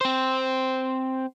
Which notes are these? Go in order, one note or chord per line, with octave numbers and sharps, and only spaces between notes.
C4 C5